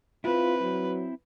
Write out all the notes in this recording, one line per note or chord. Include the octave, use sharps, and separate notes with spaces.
C4 E4 F4 B4
F#3